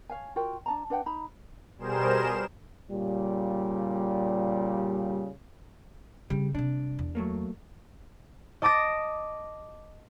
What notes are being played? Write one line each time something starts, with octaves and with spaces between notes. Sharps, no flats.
C#5 F5 G#5
F4 F#4 A#4 G5
D4 A5 A#5
D4 B4 F#5 G5
D#4 A#5 B5
B2 G3 G#4 A#4 C5 E7
A#2 C#3 G3
C#3 G3 C4
C3 G3 D4
E2
F#3 A3 A#3
D#5 A5 D6 D#6 A#6